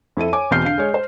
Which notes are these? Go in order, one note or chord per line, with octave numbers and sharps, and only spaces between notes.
F2 E4 A4 D#7
C#5 G#5 D6
E2 B2 C4 F6 G6 C7
D3 F5 C7
G#3 C#5
C5